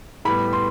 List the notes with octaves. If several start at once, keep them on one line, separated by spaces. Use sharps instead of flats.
A2 G3 B3 B5
C6